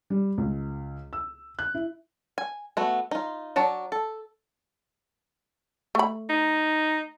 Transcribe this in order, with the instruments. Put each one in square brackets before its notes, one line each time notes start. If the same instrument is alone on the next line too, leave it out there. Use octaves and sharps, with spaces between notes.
[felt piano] G3
C#2
E6
F#6
E4
[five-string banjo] G#5
A3 B3 F#4
D#4 F4
F#3 D4 C#5 A5
A4
[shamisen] A3 B5
[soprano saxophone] D#4